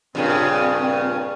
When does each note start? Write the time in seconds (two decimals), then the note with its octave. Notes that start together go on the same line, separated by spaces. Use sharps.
0.15 G2 A#2 C#3 C4